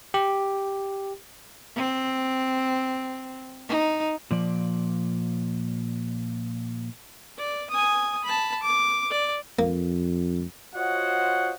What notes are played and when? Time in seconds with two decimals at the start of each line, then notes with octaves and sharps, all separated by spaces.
0.14 G4
1.76 C4
3.69 D#4
4.31 A#2 F3 D5
7.38 D5
7.70 G#5 D#6
8.24 A5 B5
8.63 D6
9.10 D5
9.59 F2 A#3
10.76 F4 F#4 C5 C#5 D#5 F#5